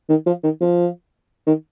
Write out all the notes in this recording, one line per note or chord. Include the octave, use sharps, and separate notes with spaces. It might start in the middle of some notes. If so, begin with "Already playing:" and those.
D#3
F3
D#3
F3
D#3